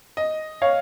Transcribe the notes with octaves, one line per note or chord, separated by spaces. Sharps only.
D#5
C#5 F5